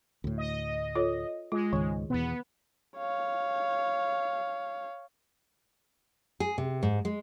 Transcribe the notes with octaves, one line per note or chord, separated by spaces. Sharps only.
D2 A2
D#5
F4 A4 C#5
G#3 F4
C#2 G#2 D#3
E2 B2 B3
C#5 F5
G#4
C3
G#2
G#3